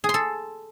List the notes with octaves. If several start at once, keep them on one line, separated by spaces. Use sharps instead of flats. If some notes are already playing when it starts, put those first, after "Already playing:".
G#4
C6
A4